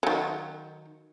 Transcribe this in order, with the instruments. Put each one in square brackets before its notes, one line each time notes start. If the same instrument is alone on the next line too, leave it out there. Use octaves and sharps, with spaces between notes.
[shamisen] D#3 F#3